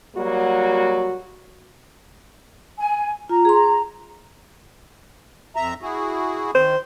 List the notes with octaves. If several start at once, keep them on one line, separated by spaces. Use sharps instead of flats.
F#3 G3 A#3 F#4
G#5
F4 A#5
G#4 C6
F2 E5 A#5
E4 F#4 G#4
D#3 C5